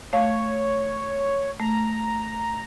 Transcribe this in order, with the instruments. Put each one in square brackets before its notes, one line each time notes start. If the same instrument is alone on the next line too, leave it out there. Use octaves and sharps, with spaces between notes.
[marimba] A3 F5 [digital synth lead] C#5
[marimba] A3 [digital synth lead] A#5